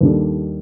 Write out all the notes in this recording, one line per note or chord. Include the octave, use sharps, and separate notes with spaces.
D#2 D#3 G3 D4 A4